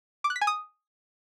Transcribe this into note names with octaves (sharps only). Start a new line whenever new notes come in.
D6
F#6
B6
G#5
D#6